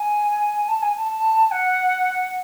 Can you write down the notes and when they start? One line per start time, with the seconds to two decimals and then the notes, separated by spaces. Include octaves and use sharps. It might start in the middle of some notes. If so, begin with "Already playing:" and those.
Already playing: G#5
0.68 A5
0.82 G#5
0.96 A5
1.51 F#5